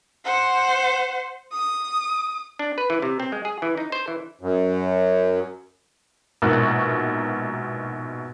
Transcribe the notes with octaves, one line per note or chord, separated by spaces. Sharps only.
C5 F#5
D#6
D4
B4
E3
C3
C4
G#3
G#4
E3
D#4
C5
E3
F#2
A#1 G#2 B2 A#4 C#6 F#6